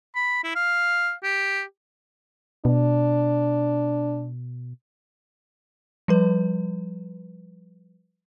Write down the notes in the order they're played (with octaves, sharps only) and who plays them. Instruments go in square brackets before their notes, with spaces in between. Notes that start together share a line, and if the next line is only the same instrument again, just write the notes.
[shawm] B5
E4
F5
G4
[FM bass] B2 [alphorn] D4
[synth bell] F3 G3 B4